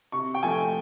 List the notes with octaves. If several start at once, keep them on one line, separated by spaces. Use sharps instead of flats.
C3 C#6
G5
F3 A3 G#5